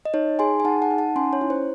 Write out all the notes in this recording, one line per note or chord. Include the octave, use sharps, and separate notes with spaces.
D#5
D#4 C#5
G#4 G#5 C6
G#5
D#4 F#5 A5
F#5 A5
D#4
F#5 A5
C#4 G#5 C6
C#5
E4
C5